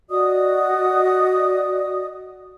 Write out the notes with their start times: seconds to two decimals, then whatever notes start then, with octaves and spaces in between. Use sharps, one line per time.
0.09 F#4 D5 D#5 D#6